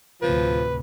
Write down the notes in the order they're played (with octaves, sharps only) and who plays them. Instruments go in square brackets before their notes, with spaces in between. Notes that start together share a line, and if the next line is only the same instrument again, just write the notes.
[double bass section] D2 A2 C3 [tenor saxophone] F3 [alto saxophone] B4